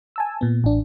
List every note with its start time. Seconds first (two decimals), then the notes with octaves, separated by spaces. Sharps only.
0.16 G#5 A5 E6
0.41 A#2 B3
0.64 A1 D4